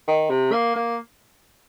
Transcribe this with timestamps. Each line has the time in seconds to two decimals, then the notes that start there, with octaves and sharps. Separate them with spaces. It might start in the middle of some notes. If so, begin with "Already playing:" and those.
0.07 D#3
0.30 C3
0.52 A#3
0.75 A#3